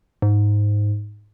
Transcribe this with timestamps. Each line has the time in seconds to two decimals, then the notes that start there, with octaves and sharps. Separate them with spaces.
0.22 G#2